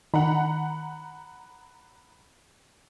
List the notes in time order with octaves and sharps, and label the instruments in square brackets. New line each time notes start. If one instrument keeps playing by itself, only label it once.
[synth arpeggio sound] D#3 [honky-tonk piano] F#5 A#5 B5